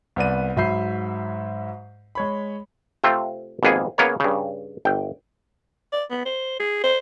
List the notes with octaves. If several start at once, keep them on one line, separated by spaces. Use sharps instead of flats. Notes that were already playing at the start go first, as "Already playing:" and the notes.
C2 B3 D5 D#7
G#2 F#3 E5 B5 G6 C7
G#3 C#5 B5
C3 A3 C4 F4
G#1 F2 A#3 B3 G#4
C#3 A#3 B3 A#4 C#5 A#5
G2 C#3
G1 G5
D5
B3
C5
G#4
C5